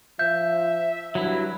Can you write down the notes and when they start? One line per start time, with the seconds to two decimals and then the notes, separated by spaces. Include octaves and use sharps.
0.19 F3 E5 G6
1.15 G2 F#3 E4